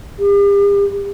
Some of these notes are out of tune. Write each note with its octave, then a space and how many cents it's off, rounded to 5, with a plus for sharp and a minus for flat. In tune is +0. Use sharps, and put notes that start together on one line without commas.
G4 +45